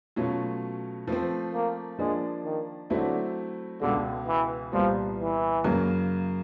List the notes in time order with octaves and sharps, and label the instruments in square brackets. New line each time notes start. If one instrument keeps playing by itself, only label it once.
[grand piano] B2 F#3 A3 C#4 F4
F3 A3 C4
[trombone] A#3
[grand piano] F3 A#3 D4 [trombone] G#3
[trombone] D#3
[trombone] D3 [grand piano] F#3 A3 C4 E4
[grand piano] C#2 B2 G#3 [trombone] D3
[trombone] E3
[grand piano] C2 A#2 G3 B3 [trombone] F3
[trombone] E3
[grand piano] F#2 C#3 F#3 A#3